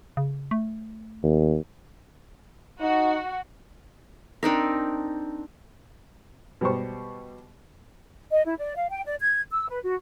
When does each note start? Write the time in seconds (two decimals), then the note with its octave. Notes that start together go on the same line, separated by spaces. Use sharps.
0.17 C#3
0.51 A3
1.23 D#2
2.81 D#4 F#4
4.43 C4 D4 D#4 A#4
6.61 B2 G3 G4 C5 C#6
8.31 D#5
8.45 E4
8.58 D5
8.76 F5
8.89 G5
9.05 D5
9.20 G#6
9.51 E6
9.69 B4
9.84 F#4